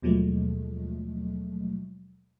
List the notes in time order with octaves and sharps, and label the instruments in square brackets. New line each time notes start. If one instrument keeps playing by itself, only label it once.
[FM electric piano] D#2 B2 F3 F#3 G#3 A3